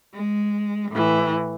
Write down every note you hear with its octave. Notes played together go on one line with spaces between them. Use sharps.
G#3
A2 E3